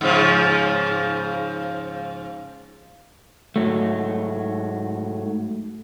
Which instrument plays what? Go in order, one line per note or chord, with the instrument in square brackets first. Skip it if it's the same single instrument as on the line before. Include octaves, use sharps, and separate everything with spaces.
[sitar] G#2 C#3 F3
[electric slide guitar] G#2 F#3 A3